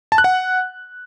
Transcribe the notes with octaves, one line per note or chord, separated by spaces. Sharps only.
A5
F#6
F#5